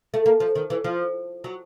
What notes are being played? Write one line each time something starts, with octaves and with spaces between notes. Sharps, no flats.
A3
A#3
F3
D#3
E3
F3
F#3